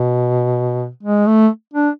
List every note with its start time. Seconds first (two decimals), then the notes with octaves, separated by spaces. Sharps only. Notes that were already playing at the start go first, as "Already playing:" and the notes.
Already playing: B2
1.03 G#3
1.27 A3
1.73 D4